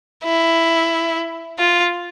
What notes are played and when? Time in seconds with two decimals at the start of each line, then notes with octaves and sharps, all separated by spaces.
0.24 E4
1.59 F4